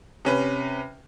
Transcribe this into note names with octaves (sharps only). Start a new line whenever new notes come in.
C3 C#4 B4